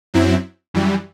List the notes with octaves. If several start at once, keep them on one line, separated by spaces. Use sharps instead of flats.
F#2 F#3 C4 E4
F#2 E3 G3